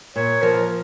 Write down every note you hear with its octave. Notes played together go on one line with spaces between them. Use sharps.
A#2 C#5
F3 A#4